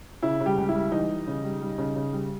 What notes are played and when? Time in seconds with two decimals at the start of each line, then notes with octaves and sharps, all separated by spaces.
0.23 C#3 E4
0.40 C#3
0.46 G3 G4
0.58 C#2
0.69 E4
0.75 G3
0.92 E3 D#4
1.10 G3
1.27 C#3
1.44 G3
1.61 G3
1.78 C#3
1.96 C#3
2.13 G3